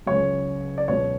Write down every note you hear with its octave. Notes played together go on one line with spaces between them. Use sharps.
C#2 C#3 F#3 C#5
D5
C#2 B2 F#3 C#5